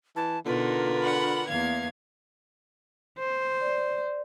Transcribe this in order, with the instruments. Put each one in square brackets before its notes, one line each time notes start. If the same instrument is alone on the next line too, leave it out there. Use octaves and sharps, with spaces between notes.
[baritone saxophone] E3 [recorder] A5
[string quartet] B2 D#4 [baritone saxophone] D3 [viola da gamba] D4 A#4 B4 [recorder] F4
[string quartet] F#5 B5
[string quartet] E2 F5 G#6 [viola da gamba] A#3 B3
[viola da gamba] C5
[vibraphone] D5